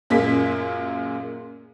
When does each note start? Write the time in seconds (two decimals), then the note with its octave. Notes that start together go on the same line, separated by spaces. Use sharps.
0.10 F#2 A#2 G#3 A#3 B6